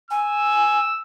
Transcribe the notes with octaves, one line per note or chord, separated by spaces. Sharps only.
G#5 E6